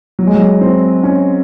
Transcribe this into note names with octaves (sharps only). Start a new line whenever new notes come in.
F#3
G#3
F#3
C4
C#4